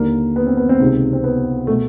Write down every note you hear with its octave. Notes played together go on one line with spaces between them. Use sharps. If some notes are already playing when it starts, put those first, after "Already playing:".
Already playing: D#2 D3 A#3
B3
C4
B3
C4
C#2 C3 D#3
C4
B3
B2 A3